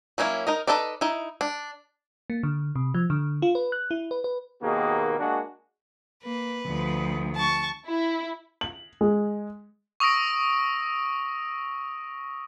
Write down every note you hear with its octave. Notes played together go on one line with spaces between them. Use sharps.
F#3 A#3 C#4 D4 E4
D#4 A#4 D#5
D#4 E4 A4 B4 D5
D#4 E4
D4
A#3
D3
C3
F3
D3
F4
B4
F#6
E4
B4
B4
D#2 B2 D#3 A#3 F#4 G#4
G#3 A#3 D4 F#4
A#3 B4
D2 F3
A5 C#6
E4
F#7
G#3
C#6 D#6 E6 A#6 D7